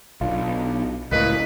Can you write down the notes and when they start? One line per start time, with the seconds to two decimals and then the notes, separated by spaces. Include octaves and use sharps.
0.21 B1 D4 F4
1.12 C#2 A2 A#4 B4 D#5 F5